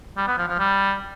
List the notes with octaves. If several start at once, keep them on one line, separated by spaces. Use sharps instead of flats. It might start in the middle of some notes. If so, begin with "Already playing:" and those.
G3
B3
F3
F3
G3